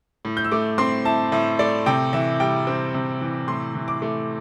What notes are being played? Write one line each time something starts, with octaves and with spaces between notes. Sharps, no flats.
A2
G6
E6
A3 D6
C4 C6
E4 A5
A2 E5
A3 D5
C3 G5
E3 E5
G3 G5
C4
C3
E3
A2 C6
E3
D6
A3